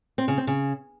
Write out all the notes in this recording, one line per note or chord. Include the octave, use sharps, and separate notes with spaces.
C4
C#3
C4
C#3